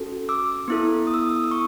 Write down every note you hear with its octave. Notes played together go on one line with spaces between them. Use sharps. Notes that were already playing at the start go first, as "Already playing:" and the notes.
Already playing: C#4 F#4 A4
D6 E6
B3 E4 A4
D#6
E6
D#6
E6
D#6
E6
C#6 D#6